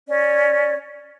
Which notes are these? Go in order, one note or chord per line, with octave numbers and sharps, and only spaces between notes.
C#4 D5